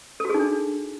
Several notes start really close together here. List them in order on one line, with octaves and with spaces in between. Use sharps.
A4 F#4 G#4 D#4 D4